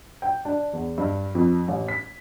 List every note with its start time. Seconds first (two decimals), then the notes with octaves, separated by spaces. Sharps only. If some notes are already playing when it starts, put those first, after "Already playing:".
0.22 G5
0.45 D4
0.73 E2
0.98 G2
1.35 F2
1.68 A1
1.88 B6